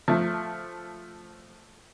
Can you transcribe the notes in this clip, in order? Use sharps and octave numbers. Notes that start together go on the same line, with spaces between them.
F3 A3